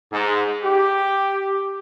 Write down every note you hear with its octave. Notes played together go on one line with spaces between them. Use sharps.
G#2
G4